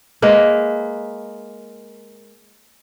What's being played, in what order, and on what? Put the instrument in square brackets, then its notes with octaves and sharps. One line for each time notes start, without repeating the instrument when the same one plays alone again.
[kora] G#3 A#3 B4